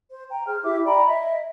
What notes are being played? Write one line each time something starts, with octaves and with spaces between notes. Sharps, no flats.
C5
G5 A#5
G#4 C5 F6
E4 G4 E5 D6
D5 G5 A#5 B5
D#5 E5